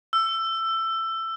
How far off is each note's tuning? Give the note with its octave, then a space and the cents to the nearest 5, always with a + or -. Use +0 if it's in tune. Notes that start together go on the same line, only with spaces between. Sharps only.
E6 +20